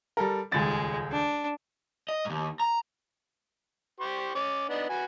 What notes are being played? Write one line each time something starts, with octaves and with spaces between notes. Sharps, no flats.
G3 A4 A#4
D#1 C#2 G#3 A6
D4
D#5
D#2 G#2
A#5
G4 C5 C#6
C#4 D6
B3 D4 D#4
F#4 B4 G#5